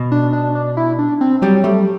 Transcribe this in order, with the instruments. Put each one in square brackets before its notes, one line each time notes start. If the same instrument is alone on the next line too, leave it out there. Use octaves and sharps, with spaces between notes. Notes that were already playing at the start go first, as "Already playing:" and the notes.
Already playing: [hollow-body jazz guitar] B2
[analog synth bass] D4
D4
D4
E4
D4
C4
[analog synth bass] F#3 [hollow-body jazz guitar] G3
[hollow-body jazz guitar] G3 [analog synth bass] A3